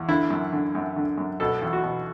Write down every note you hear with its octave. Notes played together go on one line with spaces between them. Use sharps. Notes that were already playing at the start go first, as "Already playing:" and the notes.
Already playing: E2
D3 E4
F#2
D3
F#2
D3
F#2
B2 A4
E2
F#4
B2